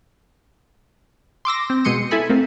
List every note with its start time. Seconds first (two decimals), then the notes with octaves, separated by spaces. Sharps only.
1.45 C6 D6 E6 A#6
1.70 C4
1.84 B2 G#3 C6 C#7 D#7
2.11 E4 A4 G#5 B5
2.29 A3 A#3 C4